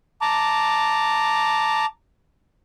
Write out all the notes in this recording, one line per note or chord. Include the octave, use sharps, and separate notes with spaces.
A5 A#5 D6